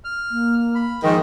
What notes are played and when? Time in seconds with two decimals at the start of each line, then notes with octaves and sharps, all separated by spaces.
0.04 F6
0.31 A#3
0.75 B5
1.03 G#2 D#3 F3 D#5 G5